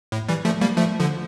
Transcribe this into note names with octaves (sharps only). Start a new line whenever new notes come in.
A2
E3 G3
F3 A3
G3 A#3
F3 A3
D3 F3